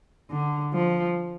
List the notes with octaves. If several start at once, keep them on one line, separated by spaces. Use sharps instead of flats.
D3
F3